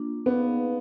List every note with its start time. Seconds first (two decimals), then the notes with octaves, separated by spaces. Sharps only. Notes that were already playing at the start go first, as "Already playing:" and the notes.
Already playing: A#3 D4 F4
0.26 B3 D#4 G#4 B4 D5 F5